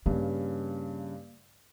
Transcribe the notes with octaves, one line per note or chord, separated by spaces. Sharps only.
G2 C#3 A#3